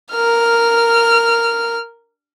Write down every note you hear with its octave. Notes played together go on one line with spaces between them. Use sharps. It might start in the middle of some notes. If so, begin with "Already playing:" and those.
A#4 F6